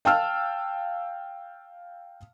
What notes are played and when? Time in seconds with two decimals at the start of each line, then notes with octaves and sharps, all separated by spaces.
0.05 F5 G5 A5 E6 F6